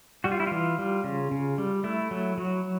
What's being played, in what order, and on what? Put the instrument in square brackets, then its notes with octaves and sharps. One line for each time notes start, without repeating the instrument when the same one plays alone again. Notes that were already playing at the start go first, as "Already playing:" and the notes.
[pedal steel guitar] G3 F#4
F4
E4
E3 F4
G3
C#3
C#3
G3
A3 E4
F#3
F#3